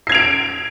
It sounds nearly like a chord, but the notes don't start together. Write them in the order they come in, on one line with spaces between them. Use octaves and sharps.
C7 G#6 F7 D7